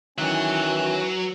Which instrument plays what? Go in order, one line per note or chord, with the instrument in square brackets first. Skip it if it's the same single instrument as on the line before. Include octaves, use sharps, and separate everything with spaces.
[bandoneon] D#3 E3 F#6 [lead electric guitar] F#3 [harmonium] C#4 [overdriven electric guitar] B4 E5